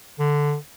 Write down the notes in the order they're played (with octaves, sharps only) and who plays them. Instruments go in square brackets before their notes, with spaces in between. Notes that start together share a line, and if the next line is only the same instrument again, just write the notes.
[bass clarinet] D3